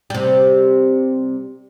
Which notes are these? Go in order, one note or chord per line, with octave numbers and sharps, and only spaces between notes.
C3 G3